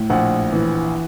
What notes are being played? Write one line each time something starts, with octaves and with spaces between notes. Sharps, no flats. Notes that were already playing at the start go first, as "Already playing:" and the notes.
Already playing: A2
A#1 F#5
E3